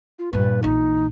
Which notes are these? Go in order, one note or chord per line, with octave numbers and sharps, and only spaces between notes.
F4
G2 A#2 B4
A#1 E3 D#4